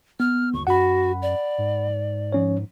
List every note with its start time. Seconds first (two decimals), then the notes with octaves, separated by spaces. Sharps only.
0.20 B3 F6
0.54 G1 D#2 C#6
0.67 F#2 F#4 F#5 B5
1.22 D5
1.58 G#2
2.32 F3 C#4 C#5